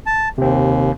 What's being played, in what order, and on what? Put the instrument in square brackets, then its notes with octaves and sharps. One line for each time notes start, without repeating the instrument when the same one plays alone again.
[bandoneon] A5
[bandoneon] D#2 [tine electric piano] C3 C4